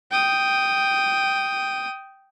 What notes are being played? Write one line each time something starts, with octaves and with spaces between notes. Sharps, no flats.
G5 D#6